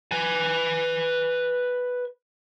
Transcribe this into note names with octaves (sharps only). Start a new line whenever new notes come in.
B4 G#5